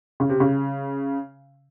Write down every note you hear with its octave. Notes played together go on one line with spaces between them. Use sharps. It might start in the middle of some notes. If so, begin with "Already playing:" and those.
C#3
C3
C#3